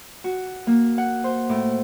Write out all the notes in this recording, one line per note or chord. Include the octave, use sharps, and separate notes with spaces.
F#4
A#3
F#5
C5
A2